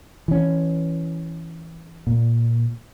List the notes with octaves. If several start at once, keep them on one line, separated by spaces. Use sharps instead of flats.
E3 C#4
A#2